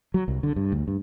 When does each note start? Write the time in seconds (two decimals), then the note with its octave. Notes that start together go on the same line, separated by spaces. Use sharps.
0.14 F#3
0.28 C2
0.43 D3
0.56 G2
0.72 D2
0.88 G2